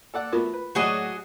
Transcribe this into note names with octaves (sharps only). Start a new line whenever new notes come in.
A4 D5 F#5
A3 B3 F4 F#4 A#4
B4
A2 F#3 F#4 G#4 D5 D#5